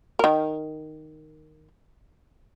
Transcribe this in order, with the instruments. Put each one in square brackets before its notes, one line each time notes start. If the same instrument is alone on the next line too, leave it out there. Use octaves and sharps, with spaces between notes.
[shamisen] D#3 A#4